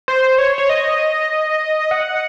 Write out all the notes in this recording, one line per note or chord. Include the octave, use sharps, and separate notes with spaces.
C5
C#5
C#5
D#5
F#5